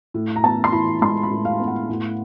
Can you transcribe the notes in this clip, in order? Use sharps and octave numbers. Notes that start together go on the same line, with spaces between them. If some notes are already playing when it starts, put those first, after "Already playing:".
A2
A#5
B3 A5
C6
E3 B5
G#3 C6
B5
A2
F5
B3
F#5
A2